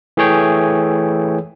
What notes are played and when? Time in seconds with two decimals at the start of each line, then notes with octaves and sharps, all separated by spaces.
0.17 E3 A3 G#4 C#5 G5